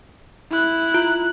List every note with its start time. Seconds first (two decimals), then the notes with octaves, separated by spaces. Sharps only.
0.51 E4 F#6
0.94 F4